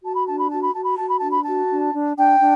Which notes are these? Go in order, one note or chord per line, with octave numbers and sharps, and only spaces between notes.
F#4 A5
B5
D4 A5
B5
F#4 A5
B5
F#4 A5
B5
F#4 A5
B5
D4 A5
B5
F#4 A5
D4
D4
D4 G5
D4